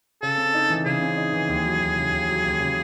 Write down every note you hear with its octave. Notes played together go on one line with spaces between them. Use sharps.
C#3 A4
C4
D#4
E3
C#3 G#4
C4
D#4
E3
D#2
F#3
D#2
C#3
D#2
F#3
D#2
C#3